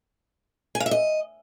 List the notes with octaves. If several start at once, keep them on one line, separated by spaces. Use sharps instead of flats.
G#5
F5
E5
D#5